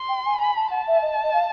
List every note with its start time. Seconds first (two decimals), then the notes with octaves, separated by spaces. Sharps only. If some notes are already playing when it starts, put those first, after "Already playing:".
Already playing: C6
0.09 G5
0.25 G#5
0.40 G#5 B5
0.56 A5
0.70 F#5 A5
0.87 E5
1.02 D#5
1.23 D#5
1.33 F5